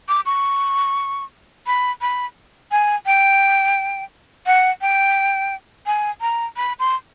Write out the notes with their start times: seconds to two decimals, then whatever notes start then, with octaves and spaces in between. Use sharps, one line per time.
0.09 D6
0.26 C#6
1.67 B5
2.01 B5
2.72 G#5
3.06 G5
4.46 F#5
4.81 G5
5.86 G#5
6.21 A#5
6.57 B5
6.79 C6